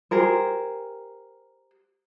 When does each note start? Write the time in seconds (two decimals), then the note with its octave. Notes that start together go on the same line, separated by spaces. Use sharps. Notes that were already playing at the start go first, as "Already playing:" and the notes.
0.11 G4 G#4 A#4 C5